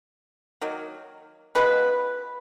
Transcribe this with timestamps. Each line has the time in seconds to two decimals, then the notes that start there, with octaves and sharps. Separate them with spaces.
0.61 D#3 F#3 A#3
1.55 B2 G#3 C#4 F4 B4